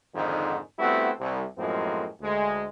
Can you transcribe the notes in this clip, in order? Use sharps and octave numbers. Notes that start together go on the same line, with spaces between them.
F2 G#2 D3 D#3
G3 A3 B3 C4 E4 F#4
C2
F#2 A2 F3 G#3 A#3 C4
D2 G#3